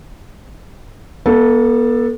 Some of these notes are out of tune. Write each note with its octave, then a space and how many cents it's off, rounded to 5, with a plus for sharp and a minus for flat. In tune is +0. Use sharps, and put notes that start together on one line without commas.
B3 -40 A4 +0